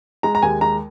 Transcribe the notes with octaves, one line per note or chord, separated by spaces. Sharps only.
G#3 A#5
A#5
D#2 G#5
G#3 A#5